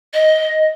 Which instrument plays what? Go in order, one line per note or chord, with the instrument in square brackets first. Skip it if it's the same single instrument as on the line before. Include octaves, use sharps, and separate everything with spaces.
[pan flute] D#5